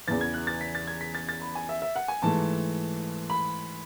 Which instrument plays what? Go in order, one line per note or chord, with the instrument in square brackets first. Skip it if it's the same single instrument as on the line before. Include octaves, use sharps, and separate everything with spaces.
[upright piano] E2 C#3 E3 B3 A6
G#6
F#6
A6
B6
A6
G#6
B6
A6
A6
B5
G#5
E5
E5
F#5
G#5
G#2 E3 A3 A5
B5